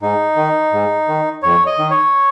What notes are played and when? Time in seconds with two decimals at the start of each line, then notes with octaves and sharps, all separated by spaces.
0.01 G#2 D#4
0.36 D#3
0.72 G#2
1.08 D#3
1.43 F2 C#5
1.66 D#5
1.78 D#3
1.91 C#5